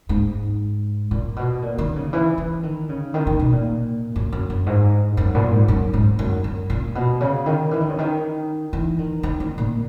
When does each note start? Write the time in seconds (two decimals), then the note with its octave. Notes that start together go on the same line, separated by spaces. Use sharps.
0.09 G#2
1.11 A#2
1.36 B2
1.62 A#2
1.78 D#3
1.96 C#3
2.13 E3
2.38 E3
2.63 D#3
2.89 C#3
3.14 D#3
3.27 D#3
3.40 B2
3.52 A#2
4.16 F#2
4.33 F#2
4.50 F#2
4.66 G#2
5.17 F#2
5.35 A#2
5.51 G#2
5.68 F#2
5.93 G#2
6.19 F#2
6.44 F#2
6.70 A#2
6.95 B2
7.21 C#3
7.46 D#3
7.71 E3
7.80 D#3
7.89 C#3
7.99 D#3
8.73 E3
8.99 D#3
9.23 D#3
9.40 D#3
9.58 A#2